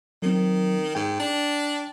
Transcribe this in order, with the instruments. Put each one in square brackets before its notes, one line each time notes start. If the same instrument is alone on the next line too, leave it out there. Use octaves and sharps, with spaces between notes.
[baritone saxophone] D#3 [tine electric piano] F#3 C4
[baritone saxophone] G#2 [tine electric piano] G5
[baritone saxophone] D4